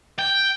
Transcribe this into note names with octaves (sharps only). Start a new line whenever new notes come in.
G5